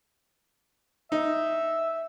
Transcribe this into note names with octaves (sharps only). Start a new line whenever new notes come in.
D#4 E5